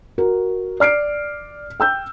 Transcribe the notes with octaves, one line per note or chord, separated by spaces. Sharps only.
F#4 A#4
D5 F6 C7 D7
G5 E6 G6